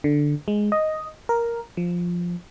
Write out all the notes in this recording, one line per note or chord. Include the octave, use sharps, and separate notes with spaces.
D3
G#3
D#5
A#4
F3